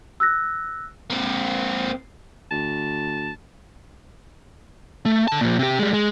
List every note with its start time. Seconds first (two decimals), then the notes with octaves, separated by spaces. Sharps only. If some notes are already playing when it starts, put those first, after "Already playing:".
0.20 E6 F#6 A#6
1.10 A#3 C4
2.51 D2 A5
5.05 A3
5.28 D3 A5
5.41 A#2 F3
5.59 C3 G4
5.79 G3 G#3
5.93 G#3